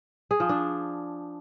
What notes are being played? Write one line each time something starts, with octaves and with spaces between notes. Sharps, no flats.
G#4
F3
D4